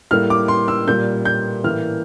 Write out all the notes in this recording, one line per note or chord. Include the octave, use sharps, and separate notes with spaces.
A2 G3 A#3 F6
D6
C6
E6
A#2 G3 A#3 G6
G6
A2 E3 A#3 F6